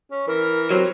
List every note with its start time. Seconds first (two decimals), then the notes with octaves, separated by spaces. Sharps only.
0.11 C#4
0.28 E3 A#4
0.71 F#3 C4